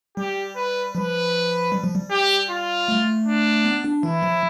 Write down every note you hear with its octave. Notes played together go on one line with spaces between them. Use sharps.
G3 G4
B4
F3 B4
G3
F3
G3
G4
F4
A3
D4
B3
D4
E3 E4
F3